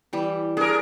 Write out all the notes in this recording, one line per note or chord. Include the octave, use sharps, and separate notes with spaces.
E3 G3
D4 G#4 A#4